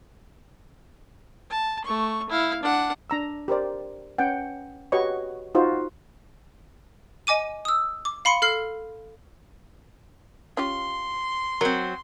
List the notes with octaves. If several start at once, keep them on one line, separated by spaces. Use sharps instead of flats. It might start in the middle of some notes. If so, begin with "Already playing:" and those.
A5
A3 C#6
E4 F5
D4 F#5
D4 A#5 E6
G4 A#4 C5 D5
C#4 B4 F#5 G5
F#4 G4 B4 C#5 D#5 C#6
D#4 F4 F#4 C5
D#5 G#5 D6 D#7
D#6 E6
D6
F5 B5 C6 C#7
A4 F6 C7
C#4 F4 G4 C6
F#3 C4 A#4